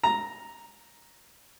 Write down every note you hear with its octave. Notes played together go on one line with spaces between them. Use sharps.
A#5